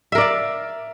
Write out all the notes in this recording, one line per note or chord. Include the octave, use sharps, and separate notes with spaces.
A#4 D5 E5 F5